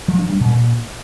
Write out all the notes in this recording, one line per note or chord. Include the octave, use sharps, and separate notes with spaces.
F3
D4
G3
A#2